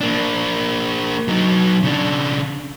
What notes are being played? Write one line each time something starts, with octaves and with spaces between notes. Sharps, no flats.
A#3 D4
F#3 D#4
C#3 D4